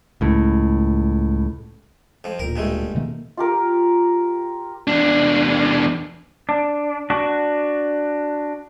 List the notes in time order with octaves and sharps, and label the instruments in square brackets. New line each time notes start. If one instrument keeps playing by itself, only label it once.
[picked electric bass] C#2 A2
[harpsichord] F2 F3
[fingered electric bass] D1 A#2 [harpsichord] A#4
[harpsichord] G2 G#3 A3
[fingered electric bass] B2 D#3 A#3
[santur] F4 G4 A#4
[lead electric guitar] E2 D4
[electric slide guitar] D4
D4 F#4